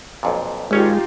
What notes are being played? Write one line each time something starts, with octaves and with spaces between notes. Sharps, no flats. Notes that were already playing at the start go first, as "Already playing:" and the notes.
B1 F2 A#2
G#1 G#3 C#4 D#4 F4 G4 C#5